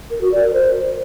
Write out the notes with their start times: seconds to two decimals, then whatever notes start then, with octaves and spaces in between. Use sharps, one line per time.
0.10 A#4
0.21 F#4
0.32 D5
0.42 A#4
0.53 C5